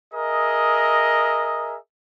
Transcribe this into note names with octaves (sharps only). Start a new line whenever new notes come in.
G#4 A#4 D#5 E5